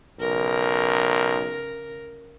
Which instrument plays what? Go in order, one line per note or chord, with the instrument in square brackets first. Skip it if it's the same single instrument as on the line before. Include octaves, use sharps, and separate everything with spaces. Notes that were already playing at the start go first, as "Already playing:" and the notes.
[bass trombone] B1 [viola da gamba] C#3 A#4